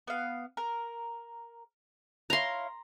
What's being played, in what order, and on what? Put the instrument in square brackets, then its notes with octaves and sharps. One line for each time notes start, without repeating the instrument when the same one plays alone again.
[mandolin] B3 F5
A#4
[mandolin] E4 C#5 F5 [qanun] A#5 C6